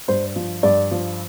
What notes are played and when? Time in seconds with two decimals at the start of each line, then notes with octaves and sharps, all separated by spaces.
0.08 G2 C5
0.36 F3
0.63 G2 D5
0.91 F3